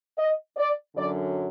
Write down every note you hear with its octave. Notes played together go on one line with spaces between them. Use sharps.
D#5
D5
F#2 D3 F#3 D5